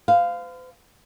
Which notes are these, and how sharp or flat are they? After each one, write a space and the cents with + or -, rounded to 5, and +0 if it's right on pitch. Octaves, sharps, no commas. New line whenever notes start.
C5 -45 F5 +0